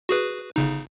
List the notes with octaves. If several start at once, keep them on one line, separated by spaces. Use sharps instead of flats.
F#4 G#4 B4
G1 C#3 D#4